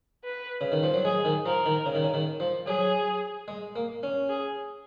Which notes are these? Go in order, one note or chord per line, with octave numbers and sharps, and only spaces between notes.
B4
C#3
D#3
F3
F#3
G#3 G#4
D#3
F3 A#4
D#3
C#3
D#3
C#3
D#3
F3
F#3 G#4
G#3
A#3
C#4
G#4